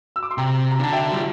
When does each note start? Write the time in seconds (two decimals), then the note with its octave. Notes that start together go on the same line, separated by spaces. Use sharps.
0.16 E6
0.23 D6
0.31 C6
0.38 C3 G5 A#5
0.71 A#5
0.79 D3 A5
0.92 E5 G5
1.12 G3